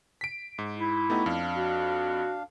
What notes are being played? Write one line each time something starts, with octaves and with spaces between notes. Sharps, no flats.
B6 D7
G#2
E4
A3 B3 D#4 F#4 G4
F2 D4 F5
F#4